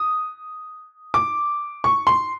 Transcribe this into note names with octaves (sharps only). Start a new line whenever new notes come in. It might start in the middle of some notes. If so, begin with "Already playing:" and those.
Already playing: D#6
D6
C#6
C6